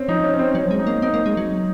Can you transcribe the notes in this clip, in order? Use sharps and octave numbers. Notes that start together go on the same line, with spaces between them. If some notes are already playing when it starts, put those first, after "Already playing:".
Already playing: C4 C#4
F3 D#4
C#4
C#4
C4
F#3 C#4
G#3
D#4
A#3
C4 D#4
A#3
G#3
F#3